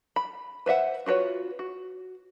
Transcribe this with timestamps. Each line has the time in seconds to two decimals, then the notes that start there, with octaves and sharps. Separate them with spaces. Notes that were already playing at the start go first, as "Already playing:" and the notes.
0.16 B5
0.66 B4 C5 E5 F#5
1.06 F4 F#4 B4 C#5
1.59 F#4